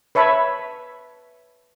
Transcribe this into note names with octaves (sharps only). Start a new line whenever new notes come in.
B4 C#5 E5 A5 B5